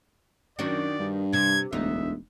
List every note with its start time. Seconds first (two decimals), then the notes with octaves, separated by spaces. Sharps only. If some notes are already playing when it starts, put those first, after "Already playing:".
0.59 F#2 D#3 D4 F#4 D5
0.99 G2
1.33 C3 G#6
1.73 E1 D2 D#4 E5